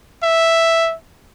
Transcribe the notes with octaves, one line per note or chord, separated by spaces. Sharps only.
E5